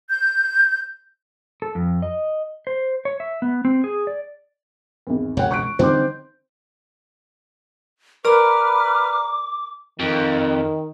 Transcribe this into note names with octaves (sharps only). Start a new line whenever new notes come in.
G6
A4
F2
D#5
C5
C#5
E5
B3
C4
G#4
D5
G#1 E2
E1 C#2 F#2 C#5 F#5
C#6 F#6 D7
D3 E3 G3 C4 D#4 C5 D6
A#4 B4 D5 A#5 D6 F6
F2 D#3